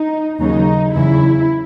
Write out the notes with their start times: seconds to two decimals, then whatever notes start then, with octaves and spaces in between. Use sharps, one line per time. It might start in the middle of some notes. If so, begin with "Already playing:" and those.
Already playing: D#4
0.38 D#2 C#3 F#3 D#4
0.93 E2 C#3 F#3 E4